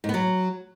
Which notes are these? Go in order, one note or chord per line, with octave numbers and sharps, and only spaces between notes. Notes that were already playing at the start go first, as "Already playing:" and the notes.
G#2
B3
F#3